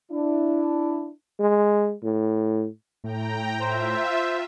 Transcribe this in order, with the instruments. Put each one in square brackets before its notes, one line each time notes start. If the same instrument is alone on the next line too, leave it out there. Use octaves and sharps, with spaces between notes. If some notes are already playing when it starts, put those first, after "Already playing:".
[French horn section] D4 E4
[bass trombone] G#3
A2
[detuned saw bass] A2 [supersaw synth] G5 A#5
[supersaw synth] F4 E5 [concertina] C5